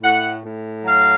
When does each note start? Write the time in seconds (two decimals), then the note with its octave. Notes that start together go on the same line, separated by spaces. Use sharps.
0.03 A2 F#5
0.45 A2
0.85 F#3 F5